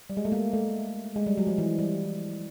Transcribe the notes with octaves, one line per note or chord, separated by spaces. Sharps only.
G3
G#3
A3
A#3
A3
G#3
G3
F#3
F3
E3
G3